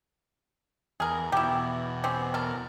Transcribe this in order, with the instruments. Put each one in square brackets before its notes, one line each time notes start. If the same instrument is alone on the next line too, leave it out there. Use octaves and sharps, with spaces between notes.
[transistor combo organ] E2 [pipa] G#4 A#4
[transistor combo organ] E2 B2 [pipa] E4 G4
[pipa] C4 C#4 G4
A4 A#4